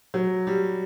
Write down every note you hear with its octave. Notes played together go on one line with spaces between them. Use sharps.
F#3
G3